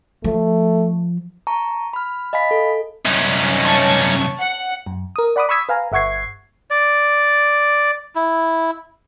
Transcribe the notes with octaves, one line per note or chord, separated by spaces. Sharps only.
F3 A3
A5 A#5 C#6
B5 F6
D#5 F5 G#5 B5 B6
A4
C2 F#2 C#4 D#4
C#5 A5 C#6
F#5
F#2
A#4 D#6
D5 F#5 B5 D6 D#6
B5 C#6 D#6 E6 G#6 B6
B4 F5 G#5 A#5
G1 E5 F#5 C#6 G#6 C7
D5
E4